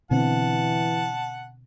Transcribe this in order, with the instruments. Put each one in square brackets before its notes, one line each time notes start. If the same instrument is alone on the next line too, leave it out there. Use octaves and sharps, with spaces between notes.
[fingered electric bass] B2 D3 C4 [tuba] E3 [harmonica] F#5 A5